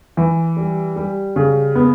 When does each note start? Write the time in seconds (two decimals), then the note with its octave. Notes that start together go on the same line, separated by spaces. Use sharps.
0.17 E3
0.57 G3
0.96 G3
1.36 C#3
1.75 B3